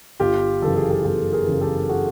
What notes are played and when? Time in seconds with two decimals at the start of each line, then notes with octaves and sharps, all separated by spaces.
0.20 G1 F4 G4
0.62 F#2 C#3 E3 A4
0.76 G#4
0.90 G4 A4
1.05 G1 G4 A4
1.33 G#4 A#4
1.47 F#2 C#3 E3
1.61 G4 A4
1.89 F#4 G#4